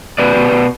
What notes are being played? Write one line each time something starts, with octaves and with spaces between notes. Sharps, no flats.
B2 B4 D5
B2
B2